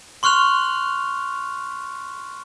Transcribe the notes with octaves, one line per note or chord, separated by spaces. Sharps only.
C6 C#6 F6 F#6 F7